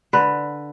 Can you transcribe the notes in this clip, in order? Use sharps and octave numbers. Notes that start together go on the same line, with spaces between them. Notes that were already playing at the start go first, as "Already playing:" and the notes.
D3 B4